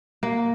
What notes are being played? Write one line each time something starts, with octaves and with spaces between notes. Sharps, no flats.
A#3